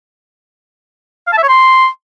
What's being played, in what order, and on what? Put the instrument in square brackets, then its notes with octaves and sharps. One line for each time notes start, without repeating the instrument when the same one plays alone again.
[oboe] F5
A5
E5
C#5
C6